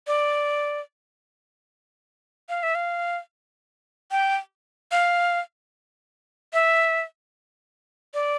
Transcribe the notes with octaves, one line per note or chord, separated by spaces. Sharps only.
D5
F5
E5
F5
G5
F5
E5
D5